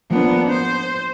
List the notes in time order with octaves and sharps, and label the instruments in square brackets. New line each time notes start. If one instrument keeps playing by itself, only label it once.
[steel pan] F3 A#3 [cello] B3 D4
[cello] C5